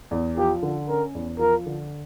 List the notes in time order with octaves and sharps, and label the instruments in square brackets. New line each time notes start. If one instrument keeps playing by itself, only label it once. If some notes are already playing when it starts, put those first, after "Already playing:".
[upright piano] E2
[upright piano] F3 [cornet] G4
[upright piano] D3
[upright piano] C#4 [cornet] A#4
[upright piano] E2
[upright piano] F3 [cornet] A#4
[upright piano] D3